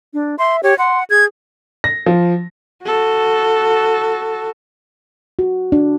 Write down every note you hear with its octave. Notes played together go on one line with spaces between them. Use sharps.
D4
E5 C6
G4 C#5
F#5 C6
G#4 G#6
A#6
F3
F#4 A4
F#4
D4